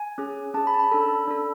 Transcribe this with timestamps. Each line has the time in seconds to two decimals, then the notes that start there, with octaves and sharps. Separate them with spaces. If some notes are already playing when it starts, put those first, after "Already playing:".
Already playing: G#5
0.18 C#4 G#4
0.54 C#4 G#4 A5
0.67 B5
0.74 A5
0.79 B5
0.92 D4 A4
1.28 D4 A4